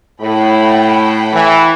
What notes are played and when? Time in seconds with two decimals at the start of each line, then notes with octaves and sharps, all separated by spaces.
0.21 A2 F#5 G5 B5
1.33 E3